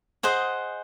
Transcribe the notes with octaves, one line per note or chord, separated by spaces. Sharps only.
G#4 C5 D#5 F#5